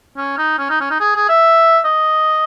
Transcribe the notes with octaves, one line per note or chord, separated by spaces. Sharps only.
C#4
D#4
C#4
D#4
C#4
D#4
G#4
G#4
E5
D#5